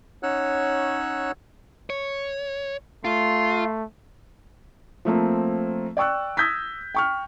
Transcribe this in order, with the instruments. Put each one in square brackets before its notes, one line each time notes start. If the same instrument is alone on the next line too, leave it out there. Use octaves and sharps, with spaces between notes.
[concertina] C#4 D#4 C#5 F#5 E6 F#6
[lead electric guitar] C#5
[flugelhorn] A3 [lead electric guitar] F4 [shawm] C6
[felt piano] F3 A3 A#3 C4
D5 G5 C#6 E6 F#6
D#6 E6 G6 G#6 A#6 B6
G5 C#6 F6